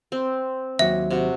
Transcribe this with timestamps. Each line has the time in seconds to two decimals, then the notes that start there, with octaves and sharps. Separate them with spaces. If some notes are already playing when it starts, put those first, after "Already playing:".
0.12 C4
0.79 D#2 F#3 E5
1.10 C3 F#4